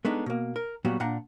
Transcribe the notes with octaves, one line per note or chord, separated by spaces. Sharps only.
G#3 A3 B3 D4 D#4
B2 A#3
A#4
A#2 F#3 G3 B3 F#4
A#2 D4 F#5 A#5